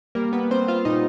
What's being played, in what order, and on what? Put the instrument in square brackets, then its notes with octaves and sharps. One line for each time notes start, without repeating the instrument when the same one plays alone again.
[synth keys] G3 A#3 A#4
B3 B4
G3 C4 C5
F4 F5
A#2 D#4 D#5